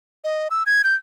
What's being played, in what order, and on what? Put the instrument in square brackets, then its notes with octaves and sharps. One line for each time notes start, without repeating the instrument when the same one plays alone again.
[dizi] D#5
E6
G#6
G6